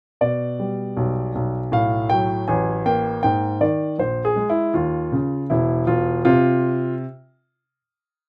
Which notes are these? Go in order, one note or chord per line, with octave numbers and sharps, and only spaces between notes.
B2 D5
G3
B1
B1
A2 F5
F#3 G5
A1 G#5
A#3 G5
G#2 G5
D#3 D5
A#1 C5
G#4
G#3
E4
D#2 F4
C#3
E1 E4
E1 F4
C3 F4